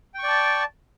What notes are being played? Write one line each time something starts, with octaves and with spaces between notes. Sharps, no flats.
D5 G5 A5 C#6